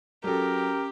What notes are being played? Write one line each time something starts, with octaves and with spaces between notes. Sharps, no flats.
F#3 C#4 G4 A4 A#4